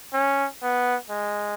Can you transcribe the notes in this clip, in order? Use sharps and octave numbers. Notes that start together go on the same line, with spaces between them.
C#4
B3
G#3